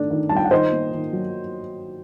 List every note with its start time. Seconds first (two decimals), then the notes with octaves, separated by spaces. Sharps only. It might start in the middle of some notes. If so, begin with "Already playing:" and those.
Already playing: D#3 A3 D4
0.11 D#3
0.29 G3 A5
0.36 G5
0.44 F#5
0.51 D#3 C5 D#5
0.72 A#3
0.93 D#3
1.12 F#3